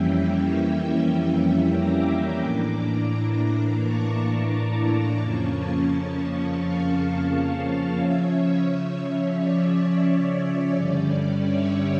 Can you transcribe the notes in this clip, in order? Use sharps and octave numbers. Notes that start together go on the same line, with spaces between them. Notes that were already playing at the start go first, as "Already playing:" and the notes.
Already playing: F2 E3 G3 A#3 C#4 E5 G5
E5 G5
A#5 D6
A2 E3 A#3 D4 A#5 D6
A5 C#6
F2 C#3 F3 A#3 C#4
F5 A5
C#3 F3 C#4 C#5 E5
D5
G2 D3 G3 C#4
C#5 E5